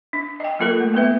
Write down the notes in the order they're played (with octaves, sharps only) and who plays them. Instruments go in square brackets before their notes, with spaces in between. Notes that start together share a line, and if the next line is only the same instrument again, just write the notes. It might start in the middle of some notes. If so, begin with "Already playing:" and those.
[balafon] D4
D#5 G5
F#3 A#3 F4 A4 A#4
A3
A#3 B3 B4 E5